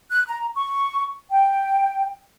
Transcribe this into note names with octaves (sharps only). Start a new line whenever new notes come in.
F#6
A#5
C#6
G5